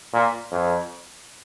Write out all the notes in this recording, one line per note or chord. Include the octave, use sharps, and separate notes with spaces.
A#2
F2